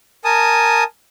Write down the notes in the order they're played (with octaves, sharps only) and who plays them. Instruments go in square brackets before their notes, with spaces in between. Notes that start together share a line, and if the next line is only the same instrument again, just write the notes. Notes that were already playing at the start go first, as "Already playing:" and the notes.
[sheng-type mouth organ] A#4 G#5 A5 D#6